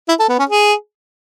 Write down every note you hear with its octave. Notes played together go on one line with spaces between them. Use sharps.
E4
A4
B3
C#4
G#4